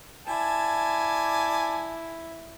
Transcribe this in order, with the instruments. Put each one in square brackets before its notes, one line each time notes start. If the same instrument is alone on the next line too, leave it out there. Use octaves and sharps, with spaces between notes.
[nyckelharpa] E4 [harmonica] D5 G#5 A5